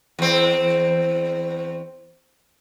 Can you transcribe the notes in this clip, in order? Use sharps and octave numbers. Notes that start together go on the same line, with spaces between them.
E2 C4